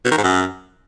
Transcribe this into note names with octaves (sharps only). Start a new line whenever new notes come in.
B2
D#3
G#2
F#2